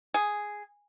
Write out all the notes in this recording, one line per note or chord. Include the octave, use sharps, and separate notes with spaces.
G#4